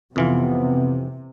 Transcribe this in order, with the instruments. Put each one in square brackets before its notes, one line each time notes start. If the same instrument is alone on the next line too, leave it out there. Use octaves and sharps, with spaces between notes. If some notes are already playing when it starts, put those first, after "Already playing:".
[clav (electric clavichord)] F2 E3 F4 [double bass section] C3 [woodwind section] B3